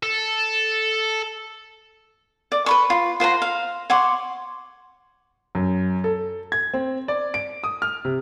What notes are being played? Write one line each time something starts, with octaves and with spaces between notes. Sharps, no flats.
A4
D5
B4 B5 C#6
F4
F4 C5 F#5 A#5
F5
C#5 F#5 C6 D6
F#2
A4
G#6
C4
D5
D7
D#6
F6
C3